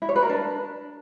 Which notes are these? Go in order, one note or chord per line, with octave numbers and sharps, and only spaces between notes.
E4
C#5
B4
A#4
D4